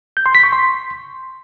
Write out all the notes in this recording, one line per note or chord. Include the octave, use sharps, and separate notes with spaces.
G6
C6
B6
C#6
C6